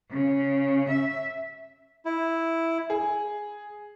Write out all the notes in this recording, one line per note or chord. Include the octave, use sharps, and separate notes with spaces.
C#3
E5
E4
G#4